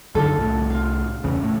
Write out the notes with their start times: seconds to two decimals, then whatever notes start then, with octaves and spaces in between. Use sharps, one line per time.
0.15 F#2 D3 D#3 F4 A4
0.37 C2 A2
0.70 F4 F5
1.24 E2 C#3
1.43 A2